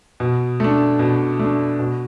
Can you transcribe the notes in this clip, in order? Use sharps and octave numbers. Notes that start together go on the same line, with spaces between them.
B2
A3 D4
B2
A3 D4
B2